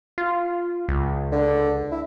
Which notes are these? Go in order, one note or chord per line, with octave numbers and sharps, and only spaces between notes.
F4
C#2
D3
E4